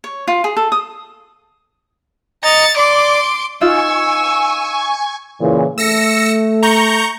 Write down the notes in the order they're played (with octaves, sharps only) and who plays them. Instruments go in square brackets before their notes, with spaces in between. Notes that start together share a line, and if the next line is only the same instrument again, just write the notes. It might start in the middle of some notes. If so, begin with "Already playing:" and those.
[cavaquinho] C#5
F4
G#4
A4
D#6
[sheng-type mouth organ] D#5 A#5 [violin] A6 C#7
[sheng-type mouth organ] D5 [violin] C6 D6
[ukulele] D#4 F4 [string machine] G#5 C#6 [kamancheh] E6
[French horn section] A#2 C#3 E3
[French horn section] A3 [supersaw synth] E6 A#6 C#7
[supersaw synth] A#5 C#6 G6